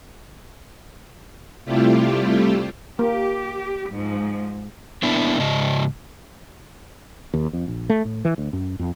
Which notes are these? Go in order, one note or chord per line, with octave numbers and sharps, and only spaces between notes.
C3 G3 A3 E4 F4 G4
A#3 G4
G#2 F3
A#3 B3 D4 E4
G#2 C#3 D#5
D#2
F2
A#1
A3
A2
E3
D2
F#2
F2